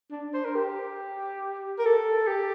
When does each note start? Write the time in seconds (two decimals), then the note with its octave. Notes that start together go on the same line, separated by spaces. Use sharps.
0.11 D4
0.34 C5
0.45 A#4
0.55 G4
1.79 A#4
1.86 A4
2.28 G4